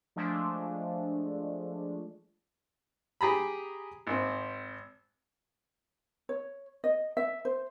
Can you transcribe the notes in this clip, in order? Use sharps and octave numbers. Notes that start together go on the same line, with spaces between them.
F3 G#3 A3 D4
G4 G#4 A#5 B5
G#1 C4
C#5
D#5
E5
C5